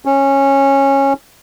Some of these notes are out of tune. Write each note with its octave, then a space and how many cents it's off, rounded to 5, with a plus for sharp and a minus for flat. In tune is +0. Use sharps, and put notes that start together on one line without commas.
C#4 -15